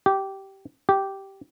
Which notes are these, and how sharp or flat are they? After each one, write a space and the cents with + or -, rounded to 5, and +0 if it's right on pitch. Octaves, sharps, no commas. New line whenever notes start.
G4 -15
G4 -10